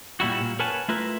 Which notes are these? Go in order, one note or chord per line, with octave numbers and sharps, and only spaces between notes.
A#2 G3 E4 F#4
A#2
A#4 B4 C#5 F#5 G#5 A5
A3 E4 F4 A#4 B4